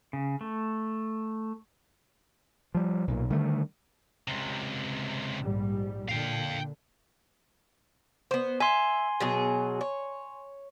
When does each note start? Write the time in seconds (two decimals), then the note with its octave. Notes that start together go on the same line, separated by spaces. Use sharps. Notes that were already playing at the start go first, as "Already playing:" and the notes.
0.13 C#3
0.41 A3
2.75 F3 G3
3.07 B1 A#2
3.30 D3 D#3 G3 A3
4.28 C#2 C3
5.42 A#1 G#2 G3
6.08 A#2 D3 F5 G5
8.31 B3 C5
8.60 E5 G#5 C6
9.20 B2 F#3 G#4
9.81 C#5